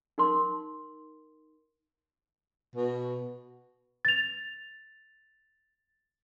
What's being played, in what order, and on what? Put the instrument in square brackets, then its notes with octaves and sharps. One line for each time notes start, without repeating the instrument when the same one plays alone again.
[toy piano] D#4 A#4 C6
[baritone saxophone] B2
[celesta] A6 F7